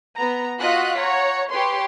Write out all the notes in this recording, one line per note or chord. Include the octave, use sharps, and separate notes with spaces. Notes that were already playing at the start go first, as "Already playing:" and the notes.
B3 A#5
F4 F#4 D#5 F#6 B6
C#5 F#5 A#5
G4 B4 C#5 C6